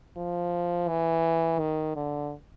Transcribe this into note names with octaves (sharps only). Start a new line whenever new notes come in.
F3
E3
D#3
D3